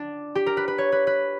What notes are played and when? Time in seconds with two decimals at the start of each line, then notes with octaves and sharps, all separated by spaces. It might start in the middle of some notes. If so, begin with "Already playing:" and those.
Already playing: D4
0.35 G4
0.46 A#4
0.57 B4
0.68 B4
0.78 C#5
0.92 B4
1.07 B4